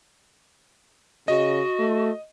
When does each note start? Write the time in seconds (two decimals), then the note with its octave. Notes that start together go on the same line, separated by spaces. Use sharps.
1.28 C#3 F#4 D#5
1.79 A3